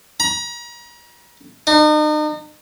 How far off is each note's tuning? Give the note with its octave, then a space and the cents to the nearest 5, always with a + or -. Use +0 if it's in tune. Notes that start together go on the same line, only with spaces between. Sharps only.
A#5 +40
D#4 -40